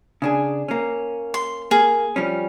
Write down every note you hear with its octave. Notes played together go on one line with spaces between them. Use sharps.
C#3 D4 G#4
A#3 C#4
C6
A#3 G#4
F3 G3 C#4